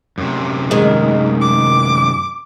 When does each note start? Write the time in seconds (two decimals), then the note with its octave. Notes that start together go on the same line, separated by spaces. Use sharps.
0.18 F#2 C3
0.71 D#3 G#3
1.41 D6